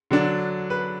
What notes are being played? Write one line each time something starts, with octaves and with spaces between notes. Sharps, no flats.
D3 F#3 D4
B4